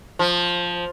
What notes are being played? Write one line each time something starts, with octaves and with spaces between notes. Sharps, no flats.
F3